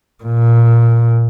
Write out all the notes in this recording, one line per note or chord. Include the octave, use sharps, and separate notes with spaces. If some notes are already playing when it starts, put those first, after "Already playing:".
A#2